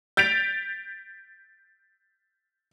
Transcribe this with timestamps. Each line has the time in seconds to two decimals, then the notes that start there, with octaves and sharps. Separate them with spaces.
0.17 G6 A6 B6 D7 F7